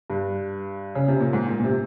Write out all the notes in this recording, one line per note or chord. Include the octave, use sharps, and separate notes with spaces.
G2
C#3
C3
A#2
G#2
A#2
A#2
C3